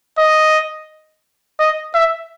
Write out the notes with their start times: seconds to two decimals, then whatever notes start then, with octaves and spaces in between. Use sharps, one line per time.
0.18 D#5
1.59 D#5
1.94 E5